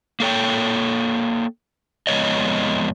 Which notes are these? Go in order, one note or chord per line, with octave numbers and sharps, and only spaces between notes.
A#3 A4 C#5 G5
F2 G#3 B3 C#5 D#5